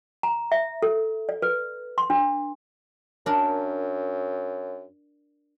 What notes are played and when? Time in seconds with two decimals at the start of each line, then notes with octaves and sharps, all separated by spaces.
0.23 A#5
0.52 E5
0.83 A4
1.29 D5
1.42 B4
1.98 C6
2.10 D4
3.26 F#2 D4 A#4